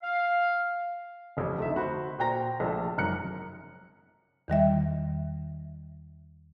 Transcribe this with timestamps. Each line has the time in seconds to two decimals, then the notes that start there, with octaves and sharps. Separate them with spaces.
0.03 F5
1.37 A1 F2
1.58 D2 A3 D#4 E5
1.76 F#4 C5 B5
2.18 A#2 F#4 C5 G5 A#5 A#6
2.60 A#1 F3 A3 A4
2.98 G#1 F#2 A#5 F#6 C#7
4.48 E2 D#3 G3 E5